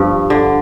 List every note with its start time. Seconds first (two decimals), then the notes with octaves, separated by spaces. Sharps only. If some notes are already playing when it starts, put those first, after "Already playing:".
Already playing: G2 F3
0.30 D3